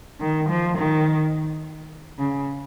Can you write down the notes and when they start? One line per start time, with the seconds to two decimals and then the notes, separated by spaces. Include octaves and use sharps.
0.20 D#3
0.49 F3
0.78 D#3
2.19 C#3